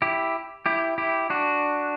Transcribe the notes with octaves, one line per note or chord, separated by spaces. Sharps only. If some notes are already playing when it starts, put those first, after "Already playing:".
E4 G4
E4 G4
E4 G4
D4 F#4